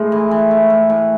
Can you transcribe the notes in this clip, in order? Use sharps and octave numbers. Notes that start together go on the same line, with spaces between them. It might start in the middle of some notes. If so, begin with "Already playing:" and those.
Already playing: A2 G#3
E3
E3
A3
A2
A2